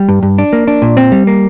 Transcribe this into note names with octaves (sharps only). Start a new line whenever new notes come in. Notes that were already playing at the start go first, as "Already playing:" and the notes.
Already playing: G3
G2
G2
D4
A#3
D4
A#2
C4
G3
A#3